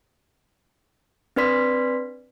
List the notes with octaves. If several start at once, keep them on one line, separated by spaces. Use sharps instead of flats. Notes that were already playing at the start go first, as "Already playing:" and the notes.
C4 D4 B4 D5 C6 B6